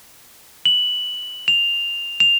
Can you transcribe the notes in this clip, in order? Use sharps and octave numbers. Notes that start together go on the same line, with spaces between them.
F#7
F7
F7